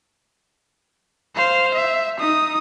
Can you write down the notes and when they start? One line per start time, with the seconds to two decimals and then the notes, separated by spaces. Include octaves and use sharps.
1.36 C5 F5
1.75 E5
2.19 D#4 D#6